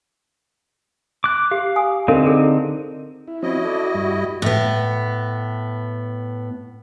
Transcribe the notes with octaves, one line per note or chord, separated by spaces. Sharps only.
D6 F#6
G4 F5
G#5 D#6
D3 C4 D#4 A4 A#4 F5
G#4 A4
E4
F3 C4 C#4 E4 F#4 D#5
A4 D5
G2 G3
A2 B3